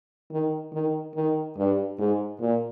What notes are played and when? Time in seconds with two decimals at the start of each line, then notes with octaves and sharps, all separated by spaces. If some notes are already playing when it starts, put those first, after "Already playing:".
0.31 D#3
0.73 D#3
1.15 D#3
1.57 G2
1.99 G#2
2.41 A#2